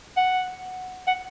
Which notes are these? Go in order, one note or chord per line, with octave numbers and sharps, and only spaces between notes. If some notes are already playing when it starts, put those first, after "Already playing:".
F#5
F#5